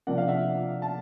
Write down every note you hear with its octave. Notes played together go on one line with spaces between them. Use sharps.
C3 F3 A#3 D4 F#5
F5
E5 F#5
A5